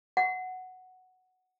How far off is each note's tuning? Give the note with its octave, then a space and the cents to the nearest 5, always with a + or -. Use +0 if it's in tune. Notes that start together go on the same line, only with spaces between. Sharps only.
F#5 +0